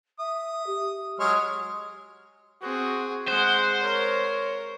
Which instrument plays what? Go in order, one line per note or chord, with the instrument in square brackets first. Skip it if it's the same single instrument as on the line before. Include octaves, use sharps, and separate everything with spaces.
[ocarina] E5 [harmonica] D#6
[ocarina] G4
[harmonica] F#3 C#5 F6 [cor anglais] G#3
[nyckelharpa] C4 G#4 [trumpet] F#4
[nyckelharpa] G#3 [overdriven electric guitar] C5 [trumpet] F#5
[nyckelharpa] A#4 [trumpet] C#5